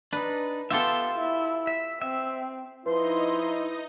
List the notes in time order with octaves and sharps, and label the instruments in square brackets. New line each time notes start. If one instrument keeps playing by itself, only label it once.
[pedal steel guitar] D4 D#4 [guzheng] B4
[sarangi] B3 [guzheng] F4 G4 A4 [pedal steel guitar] E5 C6
[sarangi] E4
[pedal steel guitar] E5
[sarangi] C4 [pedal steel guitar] E5
[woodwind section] F3 C6 [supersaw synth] D#4 D#5 [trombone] E4 [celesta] B4